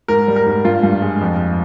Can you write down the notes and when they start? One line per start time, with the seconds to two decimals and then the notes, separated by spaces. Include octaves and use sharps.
0.08 G#2 A#4
0.28 G3
0.36 A#4
0.47 G#2
0.64 G2 F4
0.83 G2
1.02 G#3
1.21 F2